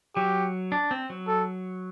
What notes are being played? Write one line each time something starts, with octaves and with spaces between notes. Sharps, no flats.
F#3 G4
D4
C4
F#3
A4